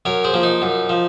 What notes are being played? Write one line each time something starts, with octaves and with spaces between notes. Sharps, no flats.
F#2 A#4 C#5
G#4 C5
F3 A#3
D#4
F#2
F3